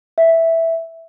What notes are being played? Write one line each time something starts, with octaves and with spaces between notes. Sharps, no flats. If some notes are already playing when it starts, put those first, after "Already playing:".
E5